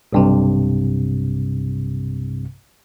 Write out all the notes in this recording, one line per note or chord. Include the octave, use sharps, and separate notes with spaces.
B1 G2 C3